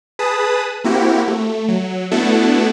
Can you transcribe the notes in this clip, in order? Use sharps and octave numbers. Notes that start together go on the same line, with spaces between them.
G#4 B4 A5 B5 D#6
A#3 C4 E4 F#4 G4
A3
F#3
A3 B3 D4 E4 F#4 A4